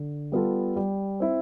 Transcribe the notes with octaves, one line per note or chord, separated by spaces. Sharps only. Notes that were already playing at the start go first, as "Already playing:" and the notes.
Already playing: D3
G3 B3 F4 A4
G3
C4 E4